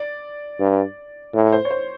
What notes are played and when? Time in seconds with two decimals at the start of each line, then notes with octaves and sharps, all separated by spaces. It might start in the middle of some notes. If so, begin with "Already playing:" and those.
Already playing: D5
0.60 G2
1.34 A2
1.52 C5
1.65 C#5
1.70 C5